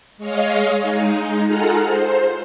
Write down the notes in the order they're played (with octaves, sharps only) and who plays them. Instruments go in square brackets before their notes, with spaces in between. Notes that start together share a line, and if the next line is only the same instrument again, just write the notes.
[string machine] G#3 C#5 D#5 F5
G#3 D#4
F4 G#4 A4 F5 F#5 A#5
C5